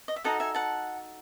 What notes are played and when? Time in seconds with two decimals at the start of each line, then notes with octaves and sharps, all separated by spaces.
0.08 D#5
0.16 E5
0.24 D#4 F#4 A4 D#5 F#5
0.40 E5 G#5
0.55 F#5 A5